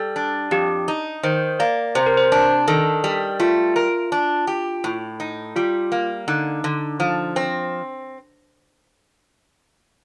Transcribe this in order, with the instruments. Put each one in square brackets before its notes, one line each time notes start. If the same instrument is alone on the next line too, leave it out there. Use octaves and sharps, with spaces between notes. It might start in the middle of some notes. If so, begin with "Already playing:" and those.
Already playing: [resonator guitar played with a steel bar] G3 [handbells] A4
[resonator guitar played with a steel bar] D4
[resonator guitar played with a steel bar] F2 [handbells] G4
[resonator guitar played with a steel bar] D#4
[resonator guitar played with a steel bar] D#3 [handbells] C5
[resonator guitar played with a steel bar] A#3 [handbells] D5
[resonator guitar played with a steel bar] C3 [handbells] C5
[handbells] A#4
C5
[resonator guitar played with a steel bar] D4
[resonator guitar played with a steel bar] D#3 [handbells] A4
[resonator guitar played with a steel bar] G3
[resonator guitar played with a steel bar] A3 [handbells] F4
[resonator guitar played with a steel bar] A#4
D4
G4
A2
D#4
[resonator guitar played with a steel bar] G3 [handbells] F4
[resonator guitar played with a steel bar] A#3
[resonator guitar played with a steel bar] D3 [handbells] D#4
[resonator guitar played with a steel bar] D3
F3
C4